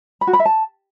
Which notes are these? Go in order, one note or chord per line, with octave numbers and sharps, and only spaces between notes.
B5
F#4
B5
E5
A5